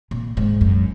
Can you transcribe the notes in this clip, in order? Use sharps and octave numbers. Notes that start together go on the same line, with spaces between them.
A#2
G#2
F#2